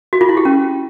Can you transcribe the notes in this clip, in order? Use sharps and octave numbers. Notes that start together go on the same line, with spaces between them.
F#4
F4
E4
G4
C#4